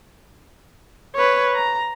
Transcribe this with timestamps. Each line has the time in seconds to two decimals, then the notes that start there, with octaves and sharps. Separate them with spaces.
1.16 B4 C#5
1.55 A#5